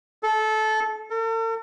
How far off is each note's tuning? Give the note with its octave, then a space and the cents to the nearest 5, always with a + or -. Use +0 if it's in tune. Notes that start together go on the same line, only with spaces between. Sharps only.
A4 -20
A4 +45